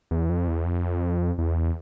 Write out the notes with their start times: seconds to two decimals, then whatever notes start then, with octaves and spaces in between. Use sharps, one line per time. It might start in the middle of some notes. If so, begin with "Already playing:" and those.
0.11 E2
0.29 F2
0.48 E2
0.66 F2
1.38 E2